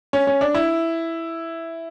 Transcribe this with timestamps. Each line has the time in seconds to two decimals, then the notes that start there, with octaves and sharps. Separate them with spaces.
0.13 C#4
0.27 C#4
0.41 D4
0.55 E4